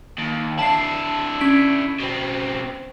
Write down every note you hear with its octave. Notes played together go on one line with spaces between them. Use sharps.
D#2
D4 E4 A5 C7
C#4 B6 D7
B2 C4